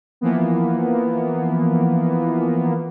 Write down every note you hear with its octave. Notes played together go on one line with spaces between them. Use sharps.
E3 F3 A#3 B3